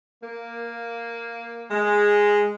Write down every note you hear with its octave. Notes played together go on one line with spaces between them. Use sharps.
A#3
G#3